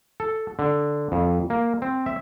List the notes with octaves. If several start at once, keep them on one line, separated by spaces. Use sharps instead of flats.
A4
D3
F2
A#3
C4
E5